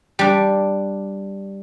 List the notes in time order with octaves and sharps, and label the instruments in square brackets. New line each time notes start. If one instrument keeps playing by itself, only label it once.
[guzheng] G3 D4